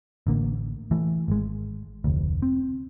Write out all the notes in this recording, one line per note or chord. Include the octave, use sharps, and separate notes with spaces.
A1 D3 A#3
E3 A3
G#1 G#3
F1 D2
C4